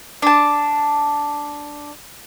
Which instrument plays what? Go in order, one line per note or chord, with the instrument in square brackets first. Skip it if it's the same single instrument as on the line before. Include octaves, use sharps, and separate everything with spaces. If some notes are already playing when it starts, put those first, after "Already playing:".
[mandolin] D4 A5